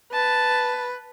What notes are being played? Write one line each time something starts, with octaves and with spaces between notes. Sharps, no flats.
B4 A5